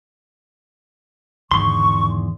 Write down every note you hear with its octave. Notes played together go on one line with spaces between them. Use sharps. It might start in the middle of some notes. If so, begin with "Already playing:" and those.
E2 G#2 D3 D#3 C6 C#6